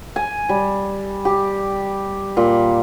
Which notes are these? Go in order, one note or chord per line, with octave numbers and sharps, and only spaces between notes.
G#5
G3
G4
A#2